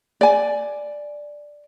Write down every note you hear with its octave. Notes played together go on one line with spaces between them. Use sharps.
D5 G#5